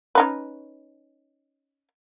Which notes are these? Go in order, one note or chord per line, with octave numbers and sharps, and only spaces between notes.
C#4 D#4 B4